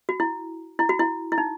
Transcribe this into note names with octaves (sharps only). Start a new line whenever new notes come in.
F#4
E4
E4
F#4
E4
E4
D#4